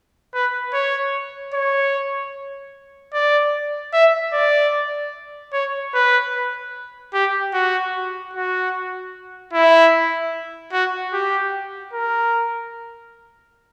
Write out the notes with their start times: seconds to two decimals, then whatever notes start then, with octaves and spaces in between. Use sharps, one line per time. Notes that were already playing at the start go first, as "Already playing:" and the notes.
0.34 B4
0.73 C#5
1.54 C#5
3.14 D5
3.93 E5
4.33 D5
5.53 C#5
5.94 B4
7.14 G4
7.54 F#4
8.34 F#4
9.53 E4
10.73 F#4
11.13 G4
11.93 A#4